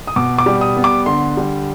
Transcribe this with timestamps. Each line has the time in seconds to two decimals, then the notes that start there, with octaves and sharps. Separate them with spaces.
0.07 D#6
0.16 B2 D6
0.39 D6
0.46 G3
0.61 D#6
0.76 B3
0.84 D6
1.06 D3 C6
1.37 G3